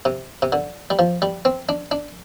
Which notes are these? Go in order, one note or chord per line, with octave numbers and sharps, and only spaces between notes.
C3
C3
D3
G3
F3
G3
C4
D4
D4